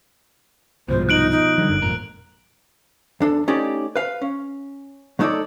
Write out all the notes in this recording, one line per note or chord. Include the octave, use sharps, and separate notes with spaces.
C2 G#2 B2 F3 C5
D#4 F#6 D7 F#7
D#4
D3 F3 G3
G1 F#2
G#1 F2 A#2 A#4
E2 D4 A4
A3 C#4 D#4 G4 C#5 D5
B4 F5
C#4
F#3 A3 D#4 A4 C#5 D5